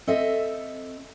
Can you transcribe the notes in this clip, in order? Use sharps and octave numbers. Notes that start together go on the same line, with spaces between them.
C4 A4 D#5 E5